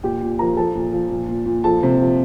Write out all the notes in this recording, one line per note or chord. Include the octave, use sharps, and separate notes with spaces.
A#2 G4 G5
A#2
F3 A#4 A#5
F3 A4 A5
A#2
F3
A#2
A#2
A#2
F3 A4 A5
C3
F3